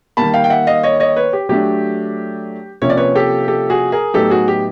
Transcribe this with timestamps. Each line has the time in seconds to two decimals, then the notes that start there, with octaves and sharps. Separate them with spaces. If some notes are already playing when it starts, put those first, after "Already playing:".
0.17 D#3 G3 A#3 A5 B5
0.34 F5 G5
0.44 G5
0.50 E5 F#5
0.67 D#5 F5
0.83 C#5 D#5
1.00 C#5 D#5
1.16 B4 C#5
1.33 G4
1.49 F#3 A3 D4 G4
2.82 C3 F3 A#3 C#4 C#5
2.90 D5
2.97 B4 C#5
3.15 G4 A4
3.48 G4 A4
3.70 F#4 G#4
3.92 G#4 A#4
4.14 A2 F#3 B3 D#4 G4 A4
4.30 F#4 G#4
4.48 G4